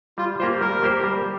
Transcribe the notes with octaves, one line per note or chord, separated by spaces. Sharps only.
G3 F4
A#3 F4 G4 C5
G3 A#4
A#3 G4 C5
G3